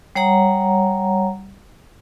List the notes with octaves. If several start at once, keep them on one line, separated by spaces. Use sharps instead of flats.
G3 C#5 F#5 A#5